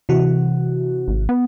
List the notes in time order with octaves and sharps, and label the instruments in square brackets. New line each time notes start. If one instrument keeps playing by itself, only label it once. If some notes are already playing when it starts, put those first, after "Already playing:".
[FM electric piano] C3 E3 F#4
[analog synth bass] G#1
B3